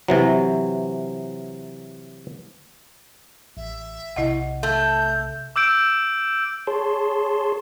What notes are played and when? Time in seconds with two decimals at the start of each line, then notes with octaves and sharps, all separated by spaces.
0.08 C3 E3 F#3
3.57 A1 E5
4.16 B1 C3 E4 D#5 F#5
4.63 A3 G6
5.56 D6 E6 G6 D7
6.67 G#4 C#5 A5 C6